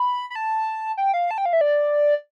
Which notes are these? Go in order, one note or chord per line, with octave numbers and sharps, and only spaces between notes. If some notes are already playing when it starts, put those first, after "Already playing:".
Already playing: B5
B5
A5
G5
F5
A5
G5
F5
E5
D5